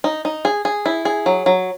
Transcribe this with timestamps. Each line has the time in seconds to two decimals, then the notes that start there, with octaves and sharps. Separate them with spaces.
0.04 D#4
0.25 D#4
0.45 G#4
0.65 G#4
0.86 E4
1.05 G#4
1.26 F#3
1.46 F#3